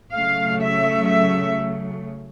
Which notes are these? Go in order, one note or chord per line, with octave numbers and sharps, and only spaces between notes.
C#3 F#3 A3 F5
E5
E5